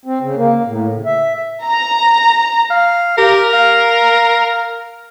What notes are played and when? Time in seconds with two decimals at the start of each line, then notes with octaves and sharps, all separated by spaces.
0.05 C4
0.22 C#3
0.36 A#3
0.66 A2
0.94 C#3
1.06 E5
1.64 A#5
2.70 F5
3.18 G4 A#4
3.53 F5